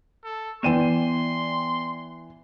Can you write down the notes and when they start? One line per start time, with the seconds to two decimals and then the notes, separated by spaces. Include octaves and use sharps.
0.24 A4
0.63 E3 B3 D5 G5 C6 D#7 E7